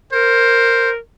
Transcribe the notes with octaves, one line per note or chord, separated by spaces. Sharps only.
A#4 C5